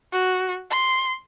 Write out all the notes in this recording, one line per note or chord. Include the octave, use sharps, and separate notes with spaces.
F#4
C6